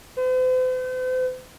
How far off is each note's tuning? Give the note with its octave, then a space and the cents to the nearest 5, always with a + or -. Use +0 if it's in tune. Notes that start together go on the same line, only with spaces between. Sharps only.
C5 -45